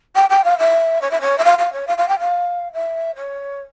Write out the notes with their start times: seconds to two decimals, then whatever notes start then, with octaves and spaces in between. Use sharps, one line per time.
0.15 G5
0.29 G5
0.44 F5
0.58 E5
1.01 C#5
1.11 E5
1.21 C#5
1.38 E5
1.44 F5
1.58 F5
1.72 C#5
1.87 F5
1.97 F5
2.08 G5
2.19 F5
2.73 E5
3.15 C#5